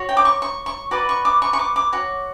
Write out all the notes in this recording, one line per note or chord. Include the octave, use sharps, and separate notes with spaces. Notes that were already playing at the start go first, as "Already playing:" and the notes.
Already playing: F#4 C#5
G5
D6
C#6
C#6
C#6
F#4 B4 D5 D6
C#6
D6
C#6
C#6
D6
D6
F#4 C#5